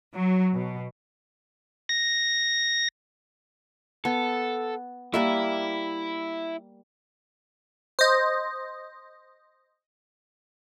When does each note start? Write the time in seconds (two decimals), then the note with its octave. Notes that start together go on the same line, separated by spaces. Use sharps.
0.15 F#3
0.54 B2
1.89 A#6
4.05 B3 A4
5.14 G3 A#3 E4 E5
7.99 C5 D#5